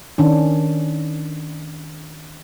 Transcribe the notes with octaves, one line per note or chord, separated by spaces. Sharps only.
D#3 C#4 D4